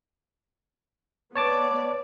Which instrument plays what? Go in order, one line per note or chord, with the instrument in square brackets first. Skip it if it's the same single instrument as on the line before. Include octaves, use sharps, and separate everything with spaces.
[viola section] B3 D5 [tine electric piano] C#5 A5 D6